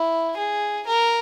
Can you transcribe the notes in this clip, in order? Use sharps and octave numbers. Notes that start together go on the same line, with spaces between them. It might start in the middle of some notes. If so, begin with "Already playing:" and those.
Already playing: E4
G#4
A#4